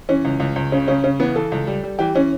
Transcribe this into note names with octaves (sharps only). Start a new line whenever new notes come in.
E3 C#4
C#2
C#2
C#2
C#3 C#4
C#3 C#4
C#3 C#4
E3 B3
E3 A4
C#2
G3
G3
E3 G4
E3 C#4